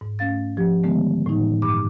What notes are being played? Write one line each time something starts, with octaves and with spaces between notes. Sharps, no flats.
G#2
A3 C#4 F5 A6
F3 G4
D3 D#3 G#3 A3 B3
A2 E3 D#4
G2 D6